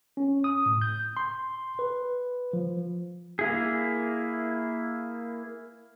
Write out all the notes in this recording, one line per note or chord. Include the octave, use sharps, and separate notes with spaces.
C#4
D#6
A2
G6
C6
B4
F3
A#3 E4 G#4